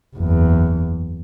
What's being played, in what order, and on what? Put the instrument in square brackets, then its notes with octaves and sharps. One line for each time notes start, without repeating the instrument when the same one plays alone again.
[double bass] F#1 E2